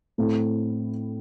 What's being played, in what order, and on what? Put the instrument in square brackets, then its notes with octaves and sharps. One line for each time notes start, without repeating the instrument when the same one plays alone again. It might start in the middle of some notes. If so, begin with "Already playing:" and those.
[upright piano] A2 A3 C4 E4